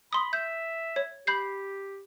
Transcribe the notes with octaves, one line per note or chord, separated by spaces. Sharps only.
B5 C6 D#6
E5 G6
C#5
G4 B5 G6 C7